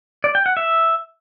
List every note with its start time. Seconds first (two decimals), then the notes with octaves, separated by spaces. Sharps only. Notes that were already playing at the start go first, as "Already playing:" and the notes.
0.24 D5
0.35 G5
0.46 F#5
0.57 E5